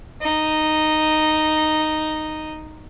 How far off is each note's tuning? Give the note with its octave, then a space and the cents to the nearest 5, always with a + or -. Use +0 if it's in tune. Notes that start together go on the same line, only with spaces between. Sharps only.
D#4 -5